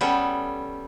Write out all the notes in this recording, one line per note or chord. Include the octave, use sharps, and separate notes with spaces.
G3 B3 C#4 A4